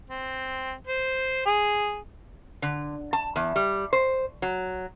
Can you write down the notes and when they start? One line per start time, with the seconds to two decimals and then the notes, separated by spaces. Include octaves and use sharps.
0.10 C4
0.87 C5
1.46 G#4
2.62 D3
3.13 A5
3.36 E2
3.56 G3
3.93 C5
4.42 F#3